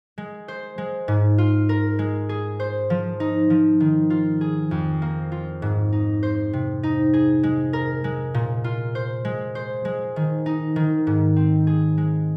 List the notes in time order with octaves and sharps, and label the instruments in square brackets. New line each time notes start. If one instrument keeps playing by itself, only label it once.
[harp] G#3
C5
G#3
G#2
F4
A#4
G#3
G#4
C5
F3
D#4
F3
D#3
F4
G#4
F2
A#3
F4
G#2
D#4
C5
C3
D#4
G#4
G#3
A#4
G#3
A#2
F4
C5
G#3
C5
G#3
D#3
D#4
D#3
G#2
C4
G#4
G#3